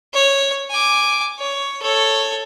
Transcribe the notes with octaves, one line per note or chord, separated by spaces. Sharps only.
C#5
G#5 D6
C#5
A4 C#5